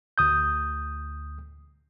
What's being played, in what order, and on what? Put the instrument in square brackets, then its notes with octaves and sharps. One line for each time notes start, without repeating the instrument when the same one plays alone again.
[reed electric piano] D2 D#6 G6